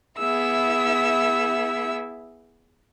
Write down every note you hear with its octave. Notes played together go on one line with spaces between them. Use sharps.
B3 E4 G#4 E5 E6